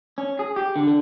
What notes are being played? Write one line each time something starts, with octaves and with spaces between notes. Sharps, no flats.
C#4
G#4
G4
D3
D3